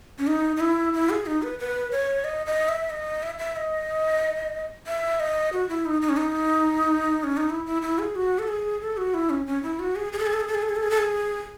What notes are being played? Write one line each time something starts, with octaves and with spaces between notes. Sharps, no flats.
C#4
D#4
D#4
E4
E4
G#4
D#4
B4
B4
C#5
D#5
D#5
E5
D#5
E5
E5
D#5
E5
D#5
F#4
E4
D#4
D#4
C#4
D#4
C#4
D#4
E4
E4
E4
G#4
F#4
A4
G#4
A4
F#4
E4
C#4
C#4
E4
F#4
G#4
G#4
A4
G#4
A4
G#4
A4
G#4
A4
G#4
A4
G#4
A4
G#4